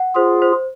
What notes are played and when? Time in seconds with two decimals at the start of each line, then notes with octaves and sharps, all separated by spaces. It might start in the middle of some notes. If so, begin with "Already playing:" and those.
Already playing: F#5
0.15 F4 G#4 C5
0.42 C5